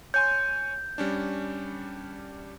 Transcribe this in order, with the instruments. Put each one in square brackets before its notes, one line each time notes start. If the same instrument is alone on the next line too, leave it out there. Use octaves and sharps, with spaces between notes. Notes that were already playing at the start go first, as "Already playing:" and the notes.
[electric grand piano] C#5 G#5 C6 [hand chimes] G6
[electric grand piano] G3 C#4 D4